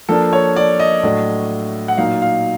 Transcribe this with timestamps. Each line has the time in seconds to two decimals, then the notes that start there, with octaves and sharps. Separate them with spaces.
0.09 F3 A#3 D4 A4
0.33 C#5
0.56 D5
0.80 D#5
1.03 A2 F#3 A3 D4
1.88 F#5
1.98 A#2 F#3 A#3 D#4 F5
2.22 F5